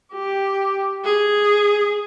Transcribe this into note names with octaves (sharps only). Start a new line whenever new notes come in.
G4
G#4